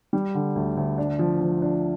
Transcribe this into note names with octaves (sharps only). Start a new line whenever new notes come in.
G3
D3
D2
D2
D4
F3
F3
D4